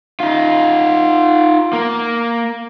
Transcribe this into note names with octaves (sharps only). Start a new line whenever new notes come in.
D#4 F4
A#3